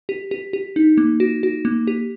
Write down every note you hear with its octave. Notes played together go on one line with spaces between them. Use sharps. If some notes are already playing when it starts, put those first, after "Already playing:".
G4
G4
G4
D#4
A#3
F#4
F#4
A#3
G4